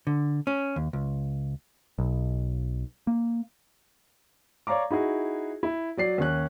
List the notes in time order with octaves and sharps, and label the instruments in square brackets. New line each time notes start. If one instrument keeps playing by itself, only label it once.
[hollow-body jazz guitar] D3
C#4
D#2
C#2
[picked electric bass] B1
A#3
[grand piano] C#5 D5 F5 A#5 D6
D#4 E4 F#4 G#4
E4
F#3 D5 C7
D#2 C#4 F#6